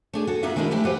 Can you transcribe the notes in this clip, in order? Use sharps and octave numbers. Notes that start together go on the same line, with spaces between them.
A3 D4 G#4
F#4 A4
A#3 D#4 F4 E5 F#5
D#3 G#3 D4 E4 A#4 B4
E3 A3 E4 G4 B4
G4 B4 C5 F5 F#5 G#5